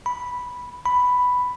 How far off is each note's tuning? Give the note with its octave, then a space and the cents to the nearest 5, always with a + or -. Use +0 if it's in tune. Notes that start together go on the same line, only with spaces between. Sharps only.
B5 -5
B5 +5